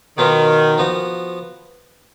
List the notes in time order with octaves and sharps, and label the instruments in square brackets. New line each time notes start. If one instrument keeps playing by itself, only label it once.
[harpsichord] B2 F#3 B3 F4 [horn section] D#3
[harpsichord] F3 B3 F#4